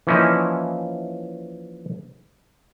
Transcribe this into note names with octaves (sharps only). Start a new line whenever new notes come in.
E3 F3 A#3 C#4 D#4 E4